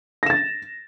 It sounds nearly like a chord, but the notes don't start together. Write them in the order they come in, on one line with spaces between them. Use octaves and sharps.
A#6 E7 A6